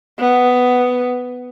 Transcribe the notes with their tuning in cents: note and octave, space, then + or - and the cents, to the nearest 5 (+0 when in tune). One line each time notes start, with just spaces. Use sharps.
B3 +10